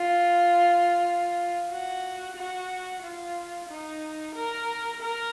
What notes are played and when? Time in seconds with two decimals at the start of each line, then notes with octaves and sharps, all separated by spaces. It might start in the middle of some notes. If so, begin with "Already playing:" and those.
Already playing: F4
1.71 F#4
2.37 F#4
3.03 F4
3.69 D#4
4.35 A#4
5.01 A#4